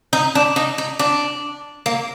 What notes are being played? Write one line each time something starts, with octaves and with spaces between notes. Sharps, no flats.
D#4
D4
D#4
D#4
D4
A#3